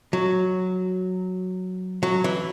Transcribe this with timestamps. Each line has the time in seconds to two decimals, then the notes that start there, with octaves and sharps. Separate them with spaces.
0.13 F#3
2.03 F#3
2.24 E3